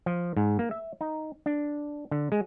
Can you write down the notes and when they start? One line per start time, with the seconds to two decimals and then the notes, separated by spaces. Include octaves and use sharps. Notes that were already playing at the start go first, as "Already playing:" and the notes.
0.06 F3
0.37 G#2
0.59 A#3
0.71 E5
1.01 D#4
1.46 D4
2.11 D3
2.32 G#3